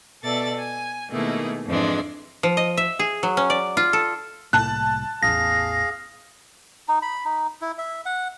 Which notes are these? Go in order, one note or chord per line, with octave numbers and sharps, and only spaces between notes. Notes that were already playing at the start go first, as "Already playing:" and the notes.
B2 A4 D5 E5 A6
G#5
B2 D#3 A3 A#3 E4 G#4
F2 G#2 E3 F3 G#3 D4
F3
D#5
E5
G#4
F#3
C#4
D5
F4
A4
C2 A2 A#3 A5 F#6
A1 E2 G#4 F5 A#6
D#4
B5
D#4
E4
E5
F#5